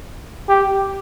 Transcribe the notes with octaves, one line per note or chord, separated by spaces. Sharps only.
G4